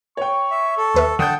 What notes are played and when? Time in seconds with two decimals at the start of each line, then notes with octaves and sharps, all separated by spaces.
0.17 C#5 G5 C#6
0.51 E5
0.78 A4
0.94 D#2 B4 E5
1.19 D3 F#5 G5 A5 D#6 G6